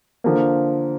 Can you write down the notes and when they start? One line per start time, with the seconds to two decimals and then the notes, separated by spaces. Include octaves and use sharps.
0.24 D3 F3 A#3